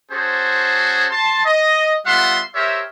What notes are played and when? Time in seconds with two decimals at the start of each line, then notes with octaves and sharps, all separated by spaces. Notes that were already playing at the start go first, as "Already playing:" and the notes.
0.12 C#4 F#4 G#4 A4 C5
1.10 A5 C6
1.45 D#5
2.06 G3 B3 F4 E5 F#5 C6
2.55 G4 A#4 C5 C#5 E5